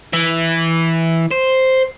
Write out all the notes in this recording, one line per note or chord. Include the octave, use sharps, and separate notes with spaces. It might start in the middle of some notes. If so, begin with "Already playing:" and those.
E3
C5